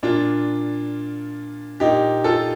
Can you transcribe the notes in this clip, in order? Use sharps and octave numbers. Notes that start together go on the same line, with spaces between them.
A#2 D4 F4
A#2 D#4 G4
F4 A4